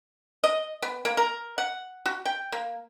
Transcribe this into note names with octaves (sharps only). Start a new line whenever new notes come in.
D#5
B3
A#3
A#4
F#5
F#4
G5
A#3